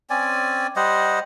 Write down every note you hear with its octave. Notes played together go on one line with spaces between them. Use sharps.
C4 C#4 D5 G#5
G3 C5 D#5 F#5